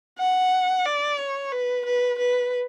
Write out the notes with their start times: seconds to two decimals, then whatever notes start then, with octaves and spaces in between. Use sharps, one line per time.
0.19 F#5
0.86 D5
1.20 C#5
1.52 B4
1.85 B4
2.19 B4